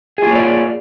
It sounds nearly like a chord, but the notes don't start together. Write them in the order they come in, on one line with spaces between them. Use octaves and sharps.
G#4 F4 A#3 C#5 D5